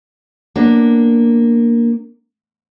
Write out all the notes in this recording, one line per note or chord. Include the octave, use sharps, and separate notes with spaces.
A#3 B3 D4